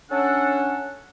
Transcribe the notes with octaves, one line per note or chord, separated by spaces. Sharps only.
C#4 D4 A4 F#5